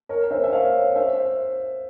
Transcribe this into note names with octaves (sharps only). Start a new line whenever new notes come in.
A#4 C#5
C5 E5
E5
C#5 F5
C5 E5